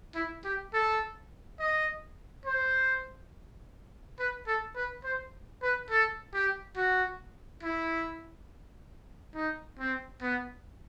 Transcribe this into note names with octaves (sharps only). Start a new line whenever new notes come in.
E4
G4
A4
D#5
C5
B4
A4
B4
C5
B4
A4
G4
F#4
E4
D#4
C4
B3